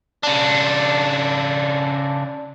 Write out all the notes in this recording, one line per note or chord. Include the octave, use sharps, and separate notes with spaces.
C#3 D4